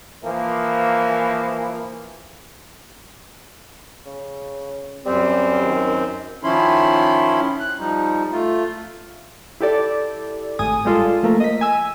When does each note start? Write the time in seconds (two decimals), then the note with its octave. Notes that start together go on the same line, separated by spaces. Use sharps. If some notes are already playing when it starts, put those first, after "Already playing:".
0.23 E3 F3 A#3
4.06 C#3
5.06 F#2 G3 C4
5.62 D#3
6.43 D#3 F3 C#4 E4 B5 C6
7.60 F#6
7.79 F3 G3 D#4
8.32 A3 F4
9.60 E4 G4 A4 D5
10.59 G#1 A2 G#5 D#6
10.85 G3 G#3 F4 A4
11.23 F3 A3 A#3 A#4
11.40 D#5 B6
11.61 G#5 E6